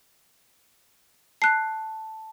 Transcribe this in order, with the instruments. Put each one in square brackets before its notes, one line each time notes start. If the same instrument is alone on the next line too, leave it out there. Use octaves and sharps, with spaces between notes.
[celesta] A5 [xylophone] F#6 C7